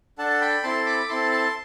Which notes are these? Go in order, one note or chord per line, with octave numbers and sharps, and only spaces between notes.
D4 A4 F#5 A5
A5
G5 B5
C4 E4 A4 A5 C6
B5 D6
B5
C4 E4 A4 A5 C6
A5 C6